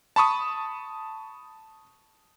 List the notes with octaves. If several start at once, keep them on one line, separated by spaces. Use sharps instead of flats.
A5 B5 C#6 D#6